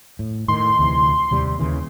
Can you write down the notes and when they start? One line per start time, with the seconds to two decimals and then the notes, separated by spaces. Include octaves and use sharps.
0.19 A2
0.48 A2 D#3 C6
0.79 D2 C3 E3
1.31 D#2 C3 G3
1.59 D#2 C#3 E3